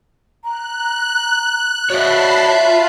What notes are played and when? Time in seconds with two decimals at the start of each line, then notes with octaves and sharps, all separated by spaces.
0.44 A#5 F#6
1.90 F#4 C#5 D5 E5 A5 B5 C7
2.49 F4 E5